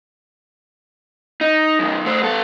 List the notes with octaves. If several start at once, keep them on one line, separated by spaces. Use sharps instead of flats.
D#4
F#2 D#3
A3 C5
B3 A4